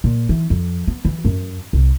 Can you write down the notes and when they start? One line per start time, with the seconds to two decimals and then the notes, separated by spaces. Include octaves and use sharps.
0.04 A#2
0.29 E3
0.50 F2
0.87 B3
1.05 E3
1.25 F#2
1.73 C2